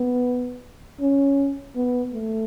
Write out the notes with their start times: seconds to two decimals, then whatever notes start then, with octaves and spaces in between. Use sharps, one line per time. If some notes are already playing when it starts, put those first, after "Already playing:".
Already playing: B3
1.00 C#4
1.76 B3
2.14 A3